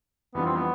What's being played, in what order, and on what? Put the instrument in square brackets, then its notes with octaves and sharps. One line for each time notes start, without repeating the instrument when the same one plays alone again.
[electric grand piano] F2 E3 G3 D4 F4 [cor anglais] B3
[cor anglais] C4
B3